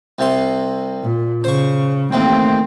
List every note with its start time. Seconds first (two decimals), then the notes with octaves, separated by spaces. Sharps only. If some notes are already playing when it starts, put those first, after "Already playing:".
0.19 C2 C3 C6
1.03 A#2
1.44 C#3 C5 C#6
2.12 A1 D#2 C3 C4